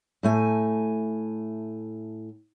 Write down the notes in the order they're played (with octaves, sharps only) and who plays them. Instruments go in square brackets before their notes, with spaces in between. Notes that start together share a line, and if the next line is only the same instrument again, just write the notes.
[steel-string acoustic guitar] A2 A3 G#5